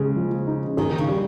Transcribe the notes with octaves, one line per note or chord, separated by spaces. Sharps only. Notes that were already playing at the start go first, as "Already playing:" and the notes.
Already playing: C#3 G#3 G4
F3
D#4
D#3 G#4
C#3
G3